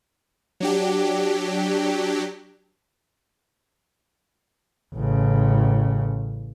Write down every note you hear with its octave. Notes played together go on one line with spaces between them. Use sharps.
F#3 D4 G4
A1 C#3